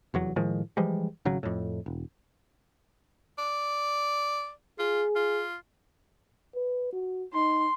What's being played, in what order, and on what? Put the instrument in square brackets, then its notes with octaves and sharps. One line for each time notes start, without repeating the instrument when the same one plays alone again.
[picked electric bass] F1 E2 F#3
A2 D#3 F3 G#3
E3 F3 G3 G#3
G#1 C#3 F#3
F2 A2
E1
[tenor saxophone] D5
[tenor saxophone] F4 [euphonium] G#4
[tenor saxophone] F4
[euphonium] B4
F#4
[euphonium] D#4 [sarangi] C6